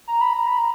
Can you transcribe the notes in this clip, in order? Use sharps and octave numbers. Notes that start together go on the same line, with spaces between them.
A#5
B5
A#5
B5
A#5